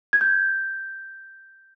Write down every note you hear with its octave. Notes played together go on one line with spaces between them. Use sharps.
G#6
G6